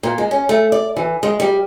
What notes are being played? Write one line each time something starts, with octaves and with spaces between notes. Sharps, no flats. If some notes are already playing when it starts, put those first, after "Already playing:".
A#2
G#3
C#4
A3
D5
E3
G#3
G3